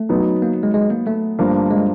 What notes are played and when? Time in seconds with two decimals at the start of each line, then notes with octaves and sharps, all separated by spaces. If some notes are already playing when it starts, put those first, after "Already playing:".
Already playing: A3
0.09 F#3 B3 D#4
0.42 A#3
0.63 G#3
0.74 G#3
0.90 A#3
1.07 A3
1.39 G2 D3 F3 A#3 D4
1.71 G#3